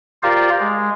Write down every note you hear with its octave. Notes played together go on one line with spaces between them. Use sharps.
F4 G4 A#4 C5 D5 F5
G#3